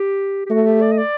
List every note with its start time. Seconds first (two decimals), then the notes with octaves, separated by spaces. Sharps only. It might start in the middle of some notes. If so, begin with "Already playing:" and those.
Already playing: G4
0.46 G4
0.50 A3 F#4
0.66 G4
0.81 D5
0.92 D#5
0.98 D5